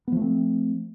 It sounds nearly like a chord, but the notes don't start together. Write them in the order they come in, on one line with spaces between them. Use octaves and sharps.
B3 F3 A3 C4